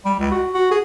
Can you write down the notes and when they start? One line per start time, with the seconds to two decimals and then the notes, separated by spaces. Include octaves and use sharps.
0.05 G3
0.19 C#2
0.32 F#4
0.54 F#4
0.71 G#4